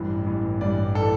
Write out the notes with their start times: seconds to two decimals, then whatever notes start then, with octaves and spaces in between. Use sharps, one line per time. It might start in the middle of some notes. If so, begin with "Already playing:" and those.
Already playing: A1 G2 E3
0.26 A1 G2 E3
0.61 A1 G2 E3 D5
0.95 E3 A4